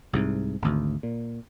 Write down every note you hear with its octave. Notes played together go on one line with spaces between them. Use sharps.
C2 G#2
G#1 D2
A#2